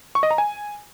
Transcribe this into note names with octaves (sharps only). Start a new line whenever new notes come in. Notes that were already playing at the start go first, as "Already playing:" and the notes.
C#6
D#5
A#5
G#5